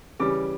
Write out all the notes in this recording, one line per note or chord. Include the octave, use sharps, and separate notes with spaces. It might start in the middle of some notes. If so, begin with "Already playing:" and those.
C#3 E3 G3 C#4 D6